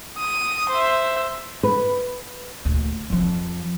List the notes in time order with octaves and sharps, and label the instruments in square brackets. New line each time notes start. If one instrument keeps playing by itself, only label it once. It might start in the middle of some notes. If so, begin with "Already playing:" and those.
[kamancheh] D#6
C5 E5
[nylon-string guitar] B4
[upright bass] D2 A#2
F2 F3